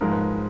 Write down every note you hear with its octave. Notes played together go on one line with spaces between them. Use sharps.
G#2 F3 G#3 A#4
B4
A#4